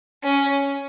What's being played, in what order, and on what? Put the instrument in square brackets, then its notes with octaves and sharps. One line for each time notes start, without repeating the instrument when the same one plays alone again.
[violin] C#4